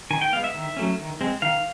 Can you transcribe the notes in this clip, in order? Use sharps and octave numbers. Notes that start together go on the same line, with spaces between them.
D#3 G#5
G5
G#3 B3 F5
E5
D#3
F#3 A3 C#4
D#3
G#3 C4
D#3 F5